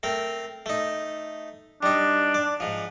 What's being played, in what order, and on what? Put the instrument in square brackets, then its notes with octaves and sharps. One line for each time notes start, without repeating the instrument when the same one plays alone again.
[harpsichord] A3 C4 A#4
A3 D#4
[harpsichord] G3 D#4 [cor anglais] D4
[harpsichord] D5
G#2 F3